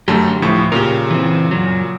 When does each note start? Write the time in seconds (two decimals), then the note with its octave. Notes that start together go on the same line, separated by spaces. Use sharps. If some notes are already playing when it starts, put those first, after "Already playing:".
0.08 F#2 D3 F#3 A3 G4 A5
0.42 D2 A2 F3 E4 C#6
0.72 A#2 C#3 G4 A#4 A#5
1.11 E3 C4
1.51 F#2 F#3